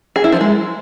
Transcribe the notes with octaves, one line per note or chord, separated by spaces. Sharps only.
G#4
E4
F3
G#3